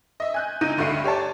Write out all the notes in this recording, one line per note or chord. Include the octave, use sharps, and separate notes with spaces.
D#5 E5
G#5 F#6 G6
C#2 D#4 G6 D#7
D2 G2 A3 F#4 C7 D#7
G4 C#5 D5 A5